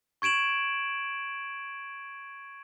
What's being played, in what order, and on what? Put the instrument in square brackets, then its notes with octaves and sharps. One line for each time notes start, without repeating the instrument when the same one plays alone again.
[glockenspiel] C#6 G#6 D7 E7 F#7